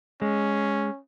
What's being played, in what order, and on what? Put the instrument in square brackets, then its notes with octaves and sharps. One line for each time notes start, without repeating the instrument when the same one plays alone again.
[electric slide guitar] G#3 [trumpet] C#4